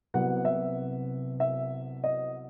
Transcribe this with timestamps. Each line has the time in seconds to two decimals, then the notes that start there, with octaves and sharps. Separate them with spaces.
0.14 C2 C3 F#3 B3 F#5
0.45 E5
1.40 E5
2.04 D#5